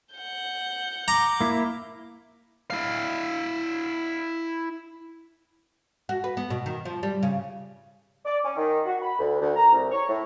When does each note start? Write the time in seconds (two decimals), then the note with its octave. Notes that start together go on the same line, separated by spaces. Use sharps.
0.15 F#5 G6
1.08 A#5 D6
1.41 A#3 E4
2.70 E4 F5
6.09 F#4
6.24 B4
6.37 B3
6.50 B2
6.66 D#3
6.85 F3
7.03 G3
7.23 C#3
8.25 D5
8.44 C#4
8.57 D#3
8.86 F#4
9.01 B5
9.19 D2
9.40 D2
9.56 A#5
9.72 C2
9.91 C#5
10.08 A2